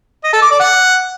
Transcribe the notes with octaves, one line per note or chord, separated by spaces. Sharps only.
D#5
A4
D6
D5
F#5